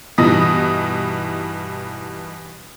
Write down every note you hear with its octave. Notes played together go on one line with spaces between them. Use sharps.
G2 B2 E3 D#4 D#6 A#6